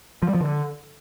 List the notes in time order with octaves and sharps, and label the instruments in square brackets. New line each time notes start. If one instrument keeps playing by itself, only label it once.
[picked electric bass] F3
G3
F3
D3